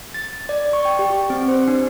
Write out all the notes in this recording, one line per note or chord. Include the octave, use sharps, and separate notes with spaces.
A6
D5
C#6
G5
G4
C4
C5
D4